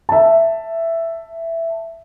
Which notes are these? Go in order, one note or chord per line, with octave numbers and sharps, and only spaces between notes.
E5 A5